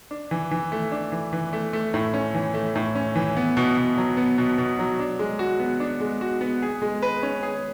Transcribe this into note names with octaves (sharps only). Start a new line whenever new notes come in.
D4
E3
E3
A3
D4
E3
E3
A3
A3
A2
C#4
E3
A3
A2
C#4
E3
B3
B2
B2
F#3
B3
B2
B2
F#3
D4
G#3
F#4
B3
D4
G#3
F#4
B3
G#4
G#3
B4
C#4
G#4